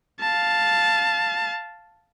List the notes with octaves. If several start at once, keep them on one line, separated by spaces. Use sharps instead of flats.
F5 A5